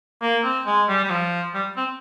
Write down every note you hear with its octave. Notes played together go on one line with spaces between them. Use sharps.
A#3
C4
G#3
G3
G3
F3
G3
C4